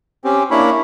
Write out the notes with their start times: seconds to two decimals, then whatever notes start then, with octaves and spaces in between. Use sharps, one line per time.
0.25 C4 C#4 G4
0.51 A#3 D4 E4 C#5 B5